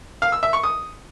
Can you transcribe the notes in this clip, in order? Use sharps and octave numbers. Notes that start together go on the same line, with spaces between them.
F5
E6
E5
C#6
D#6